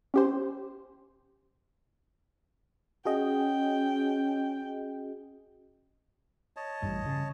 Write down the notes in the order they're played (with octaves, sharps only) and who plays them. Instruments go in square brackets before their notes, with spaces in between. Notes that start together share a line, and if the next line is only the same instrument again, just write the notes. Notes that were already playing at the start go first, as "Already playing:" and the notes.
[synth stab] C#4 G4 C5
[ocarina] C#4 [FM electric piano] F#4 G#4 D#5 [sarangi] G5
[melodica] C#5 D#5 A5
[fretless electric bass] A1 G2
C#3